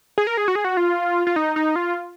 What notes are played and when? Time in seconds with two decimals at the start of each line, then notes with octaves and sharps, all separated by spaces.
0.18 G#4
0.27 A#4
0.37 G#4
0.48 F#4
0.55 G#4
0.64 F#4
0.77 F4
1.27 F4
1.36 D#4
1.56 D#4
1.76 F4